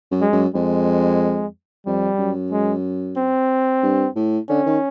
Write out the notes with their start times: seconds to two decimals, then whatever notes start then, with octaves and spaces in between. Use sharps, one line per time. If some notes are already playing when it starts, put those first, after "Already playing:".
0.11 F#2
0.21 G#3
0.32 F#2
0.55 F2 G#3
1.86 F2 G3
2.18 F#2
2.52 G#3
3.17 C4
3.83 G2
4.16 A2
4.49 D3 C#4
4.66 D#3